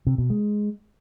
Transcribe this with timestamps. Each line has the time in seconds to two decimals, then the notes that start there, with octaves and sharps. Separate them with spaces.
0.07 C3
0.18 B2
0.30 G#3